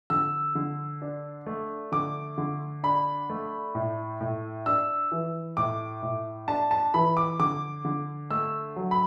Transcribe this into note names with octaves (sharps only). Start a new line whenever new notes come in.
D3 E6
D3
D4
A3
D3 D6
D3
D4 B5
A3
A2
A2
D4 E6
E3
A2 D6
A2
D4 A5
A5
E3 B5
D6
D3 D6
D3
A3 E6
F#3
B5